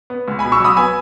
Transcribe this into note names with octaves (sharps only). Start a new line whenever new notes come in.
B3
C#2
G#5 B5
B2
C#6 E6
F#3 B5 D#6
B3 G#5 B5